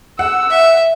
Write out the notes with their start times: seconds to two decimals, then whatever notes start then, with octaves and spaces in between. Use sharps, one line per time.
0.19 F#5 E6
0.50 E5